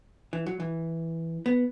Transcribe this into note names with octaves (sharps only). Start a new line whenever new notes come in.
E3
F#3
E3
B3